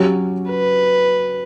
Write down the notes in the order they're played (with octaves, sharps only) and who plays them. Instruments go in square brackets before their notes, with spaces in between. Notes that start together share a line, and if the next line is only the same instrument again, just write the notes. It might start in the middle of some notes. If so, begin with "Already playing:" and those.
Already playing: [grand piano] F#3 C#4 G4
[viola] B4